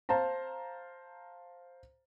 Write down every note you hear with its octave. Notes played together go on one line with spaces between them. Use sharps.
C5 F5 A5 A#5